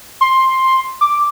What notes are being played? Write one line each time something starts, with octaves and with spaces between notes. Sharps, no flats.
C6
D6